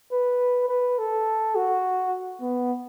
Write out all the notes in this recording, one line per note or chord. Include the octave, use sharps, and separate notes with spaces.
B4
B4
A4
F#4
B3